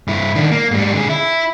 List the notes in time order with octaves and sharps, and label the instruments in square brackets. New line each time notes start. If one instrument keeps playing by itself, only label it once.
[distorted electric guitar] G2 E4
D#3 D4
A#3
G#2 G3
D3 G#4
E4